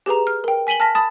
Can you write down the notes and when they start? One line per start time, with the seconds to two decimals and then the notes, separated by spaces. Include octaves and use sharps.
0.06 G4 G#4 B4 A#5
0.27 F6
0.44 A#4 G5
0.67 G#5 B6 D#7 F#7 G7
0.80 A5 F6 A#6 B6
0.95 A5 B5 D#6 A6